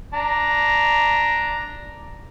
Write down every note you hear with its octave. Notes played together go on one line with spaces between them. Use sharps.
D4 A#5